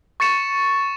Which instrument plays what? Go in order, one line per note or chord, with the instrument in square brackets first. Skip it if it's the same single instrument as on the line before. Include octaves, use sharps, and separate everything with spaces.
[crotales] C#6 A6 C#7 E7